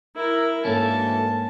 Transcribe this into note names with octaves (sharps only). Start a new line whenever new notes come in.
E4 A#4 E5
D2 G#2 E3 A#3 C#4 A4 A5